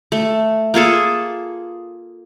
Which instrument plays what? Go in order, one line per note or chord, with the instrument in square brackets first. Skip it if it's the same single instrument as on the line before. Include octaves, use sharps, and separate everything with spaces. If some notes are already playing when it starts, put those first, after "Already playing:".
[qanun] A3
A#3 F4 G#4 A4